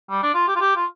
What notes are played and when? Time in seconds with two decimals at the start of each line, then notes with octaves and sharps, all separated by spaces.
0.10 G3
0.23 D4
0.34 F4
0.48 G4
0.56 F4
0.60 G4
0.76 F4